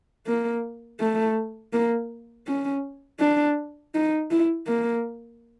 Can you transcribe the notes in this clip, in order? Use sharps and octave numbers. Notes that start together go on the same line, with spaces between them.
A#3
A3
A#3
C#4
D4
D#4
E4
A#3